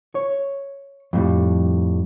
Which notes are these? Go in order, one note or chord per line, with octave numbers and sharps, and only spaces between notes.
C#5
F2 A2 G3